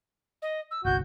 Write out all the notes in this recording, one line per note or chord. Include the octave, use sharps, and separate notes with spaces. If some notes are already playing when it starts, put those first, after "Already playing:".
D#5
E6
G1 C2 F#4 G6